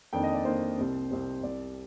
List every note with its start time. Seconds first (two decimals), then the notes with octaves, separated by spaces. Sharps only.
0.13 F2 D#3 A#3 D4 G5
0.24 D#5
0.34 D5
0.45 F2 D#3 A#3 D4 C5
0.78 C2 C3 G3 C4
1.11 C2 C3 G3 C4
1.43 C2 C3 G3 D5